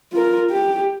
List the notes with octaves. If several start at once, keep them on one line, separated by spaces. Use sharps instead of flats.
F4 A#4
G4